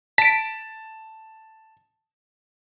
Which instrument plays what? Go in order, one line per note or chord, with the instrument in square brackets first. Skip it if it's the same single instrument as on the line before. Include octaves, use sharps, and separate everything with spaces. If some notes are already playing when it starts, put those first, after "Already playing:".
[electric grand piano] A5 [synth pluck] B6 D7